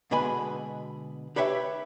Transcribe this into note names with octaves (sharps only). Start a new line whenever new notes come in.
B2 D3 G#3 B4 G#5 B5
G4 B4 C#5 E5 G5